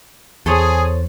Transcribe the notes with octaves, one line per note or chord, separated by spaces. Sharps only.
E2 G#4 A4 C5 C#5